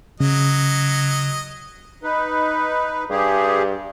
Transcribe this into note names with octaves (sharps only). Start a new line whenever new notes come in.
C#3 F#3 D#5
D#4 B4
G2 G4 G#4